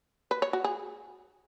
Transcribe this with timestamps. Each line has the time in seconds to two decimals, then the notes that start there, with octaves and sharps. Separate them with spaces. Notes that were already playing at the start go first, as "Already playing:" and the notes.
0.31 B4
0.42 C#5
0.53 F#4
0.64 G#4